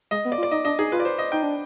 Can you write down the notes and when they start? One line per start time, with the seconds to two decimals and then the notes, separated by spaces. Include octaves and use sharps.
0.11 G#3 D#5
0.25 B3
0.32 D5
0.38 F4
0.43 D5
0.51 D#4 D#5
0.65 D4 D#5
0.78 D#4 G#4
0.92 F4 B4
1.00 D5
1.05 C5
1.18 D#5
1.32 D#4 G5
1.43 D4